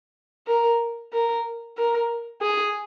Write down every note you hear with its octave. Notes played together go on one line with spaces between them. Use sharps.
A#4
A#4
A#4
G#4